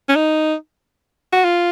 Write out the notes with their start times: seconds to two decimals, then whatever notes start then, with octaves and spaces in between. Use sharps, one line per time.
0.09 C#4
0.15 D#4
1.33 F#4
1.44 F4